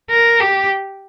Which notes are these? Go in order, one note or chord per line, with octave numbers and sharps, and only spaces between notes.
A#4
G4